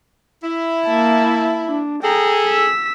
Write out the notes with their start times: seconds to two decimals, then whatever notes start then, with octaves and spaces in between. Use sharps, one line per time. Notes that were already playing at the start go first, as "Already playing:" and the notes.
0.43 E4
0.87 A#3 A5
1.67 D4
2.03 G#4 A4 G5 A#5
2.44 E6 B6